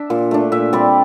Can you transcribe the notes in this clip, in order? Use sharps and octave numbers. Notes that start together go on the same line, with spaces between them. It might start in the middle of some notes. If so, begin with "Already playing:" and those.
Already playing: D4 E5
A#2
A3 D4
A#2 E5
G3 C4 D5